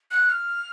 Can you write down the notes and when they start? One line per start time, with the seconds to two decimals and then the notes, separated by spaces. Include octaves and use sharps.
0.11 F#6
0.30 F6